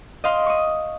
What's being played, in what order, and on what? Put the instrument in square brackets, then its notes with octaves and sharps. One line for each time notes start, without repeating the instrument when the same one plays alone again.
[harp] D#5 F5 C6
C#6 D#6